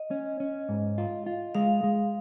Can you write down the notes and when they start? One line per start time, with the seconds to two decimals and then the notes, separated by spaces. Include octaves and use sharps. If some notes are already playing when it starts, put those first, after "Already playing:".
Already playing: D#5
0.11 C#4
0.40 C#4
0.69 G#2
0.98 F4
1.26 F4
1.55 G#3 F5
1.84 G#3